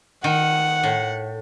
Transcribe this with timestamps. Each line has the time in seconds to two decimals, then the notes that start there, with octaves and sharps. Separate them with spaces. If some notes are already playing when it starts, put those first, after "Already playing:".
0.24 D#3 F#5
0.83 A2